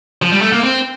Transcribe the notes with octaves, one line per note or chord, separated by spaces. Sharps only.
F3
G3
A3
A#3
C4